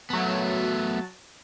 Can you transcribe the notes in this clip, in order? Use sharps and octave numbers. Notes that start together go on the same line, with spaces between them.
F#3 A3 B3 A5